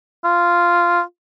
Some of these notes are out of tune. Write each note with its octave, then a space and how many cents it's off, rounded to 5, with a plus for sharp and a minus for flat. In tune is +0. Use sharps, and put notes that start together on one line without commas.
F4 -10